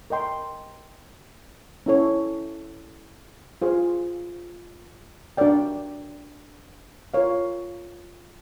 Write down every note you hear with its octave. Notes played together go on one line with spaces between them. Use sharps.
A#4 D#5 G5 C6
C#4 E4 A4 C#5
F4 G#4 C5 F5
D4 F#4 A#4 D5 G5
F4 A#4 C#5 F5